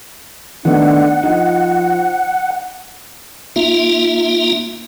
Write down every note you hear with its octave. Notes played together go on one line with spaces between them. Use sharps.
D#3 A3 B3 D4 F#5
F3 D#4
A#3 D#4 F4 E5